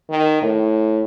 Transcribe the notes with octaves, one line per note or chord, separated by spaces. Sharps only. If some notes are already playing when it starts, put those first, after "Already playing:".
D#3
A2